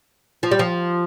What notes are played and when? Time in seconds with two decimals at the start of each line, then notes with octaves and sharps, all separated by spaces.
0.43 F3
0.51 G3
0.59 F3